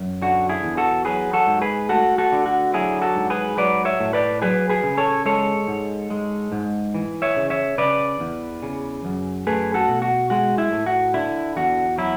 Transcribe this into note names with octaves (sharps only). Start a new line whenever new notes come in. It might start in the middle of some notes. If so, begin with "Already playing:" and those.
Already playing: F#2
D3 F#4
E4 G#4
E2
F#4 A4
F#3 G#4 B4
F#4 A4
G#2
G#4 B4
A3 F#4 A4
F#4 A4
D3
F#4
F#3 E4 G#4
F#4 A4
G#2
G#4 B4
F#3 B4 D5
C#5 E5
A2
B4 D5
F#3 G#4 B4
G#4 B4
C#3
A4 C#5
G#3 A4 C#5
G#2
G#3
G#2
E3
C#5 E5
C#3
C#5 E5
C#3 B4 D5
E2
C#3
F#2
A3 G#4 B4
F#4 A4
B2
F#4
G#3 F#4
E4
A2
F#4
D3 E4
E2 F#4
F#3 E4